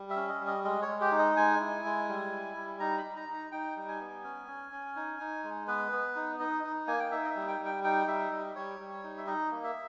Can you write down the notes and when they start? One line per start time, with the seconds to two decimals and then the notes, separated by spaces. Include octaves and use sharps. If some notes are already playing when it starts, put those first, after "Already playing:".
Already playing: G3
0.10 E5
0.16 C#4
0.28 D#5
0.41 G3
0.47 D#5
0.64 G#3 D#5
0.82 C#5
0.88 G#3
1.01 G4
1.12 D#4
1.19 D#5
1.37 G#3 G#5
1.60 E4
1.85 G#3
2.09 G3
2.32 E4
2.56 G3
2.80 D#4 A#5
2.98 B5
3.04 D#4
3.16 A#5
3.28 D#4
3.34 A#5
3.52 D#4 G5
3.76 G3
3.88 G#5
4.00 B3
4.24 C#4
4.47 C#4
4.72 C#4
4.96 D#4
5.20 D#4
5.44 G#3
5.67 B3 B4
5.92 B3
6.16 D#4
6.40 D#4 D#5
6.64 D#4
6.87 A#3 G#5
7.00 G5
7.11 D#4 E5
7.25 D#5
7.30 E5
7.36 G3
7.48 G5
7.59 G3
7.65 G5
7.84 D#4 G5
8.07 G3 E5
8.31 G3 D#5
8.55 G3 C#5
8.80 G3
9.03 D#4
9.18 E5
9.27 D#4 D#5
9.51 A#3
9.64 E5